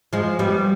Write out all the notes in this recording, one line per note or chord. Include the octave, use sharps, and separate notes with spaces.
F3 G#3
G3 B3